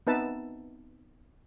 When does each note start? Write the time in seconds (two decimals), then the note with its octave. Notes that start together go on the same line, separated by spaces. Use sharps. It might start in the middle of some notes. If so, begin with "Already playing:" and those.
0.07 B3 C4 D#4 B4 E5 A5